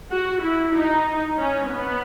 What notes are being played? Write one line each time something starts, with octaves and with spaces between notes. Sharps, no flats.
F#4
E4
D#4
C#4
B3